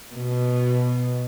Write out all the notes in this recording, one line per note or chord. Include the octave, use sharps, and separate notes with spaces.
B2